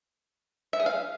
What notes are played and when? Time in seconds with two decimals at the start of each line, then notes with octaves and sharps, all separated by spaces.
0.73 E5
0.80 G#4
0.86 F5